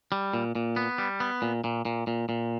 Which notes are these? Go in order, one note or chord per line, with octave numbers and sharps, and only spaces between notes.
G3
A#2
A#2
B3
G3
B3
A#2
A#2
A#2
A#2
A#2